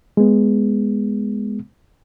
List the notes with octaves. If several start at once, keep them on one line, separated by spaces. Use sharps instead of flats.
G#3 B3